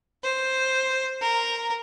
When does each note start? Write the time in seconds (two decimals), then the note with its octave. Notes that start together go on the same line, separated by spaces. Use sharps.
0.23 C5
1.21 A#4